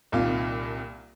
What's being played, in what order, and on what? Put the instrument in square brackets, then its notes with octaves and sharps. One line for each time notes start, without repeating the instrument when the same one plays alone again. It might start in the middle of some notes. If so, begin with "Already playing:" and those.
[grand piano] C2 A#2 D#3 F4